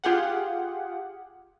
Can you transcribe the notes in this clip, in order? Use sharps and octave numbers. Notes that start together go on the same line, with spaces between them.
F4 G4 G#4 F#5